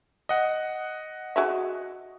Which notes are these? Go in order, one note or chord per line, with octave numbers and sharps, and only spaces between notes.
D#5 F#5
F#4 G#4 E5